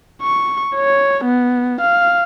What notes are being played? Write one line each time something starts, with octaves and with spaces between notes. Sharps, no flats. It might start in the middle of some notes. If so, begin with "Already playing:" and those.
C#6
C#5
B3
F5